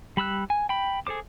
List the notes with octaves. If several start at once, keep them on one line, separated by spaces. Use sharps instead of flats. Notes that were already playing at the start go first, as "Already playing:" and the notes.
G3 B5 E6 F#6
G#5
G5 B5
G#4 A4 C5 D6